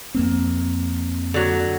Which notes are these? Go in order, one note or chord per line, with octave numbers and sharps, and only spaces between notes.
F2 A#3 C4
D3 F#3